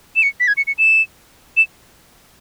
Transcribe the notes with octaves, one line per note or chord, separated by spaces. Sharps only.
E7
C#7
B6
G#6
C#7
C#7
E7
E7